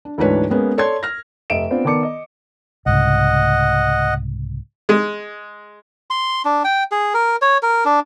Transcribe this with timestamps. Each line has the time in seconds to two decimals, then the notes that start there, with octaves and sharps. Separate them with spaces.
0.05 D4
0.18 D2 G#2 E3 D4 B4 C#5
0.50 G#3 A#3 B3 C#4
0.78 A4 C#5 D5 A5 C6 G#6
1.03 F6 A#6
1.50 F1 D#5 E5 D7 E7
1.71 B3 C4 D4 F4
1.84 D#3 B3 D5 A5 D6 C#7
2.03 D#5
2.86 C2 G#2 C#3 D#5 F#5
4.89 G#3
6.10 C6
6.45 D4
6.64 G5
6.92 G#4
7.14 A#4
7.42 C#5
7.62 A#4
7.85 D4